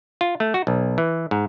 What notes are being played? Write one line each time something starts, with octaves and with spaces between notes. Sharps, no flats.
F4
A3
F#4
B1
E3
G#2